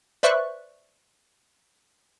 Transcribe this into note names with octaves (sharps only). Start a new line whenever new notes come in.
B4 C5 D5 E5 C#6 F#6